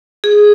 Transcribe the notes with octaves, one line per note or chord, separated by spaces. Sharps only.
G#4